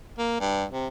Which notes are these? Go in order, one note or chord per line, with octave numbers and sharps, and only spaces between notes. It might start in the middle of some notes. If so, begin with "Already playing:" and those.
A#3
G2
C3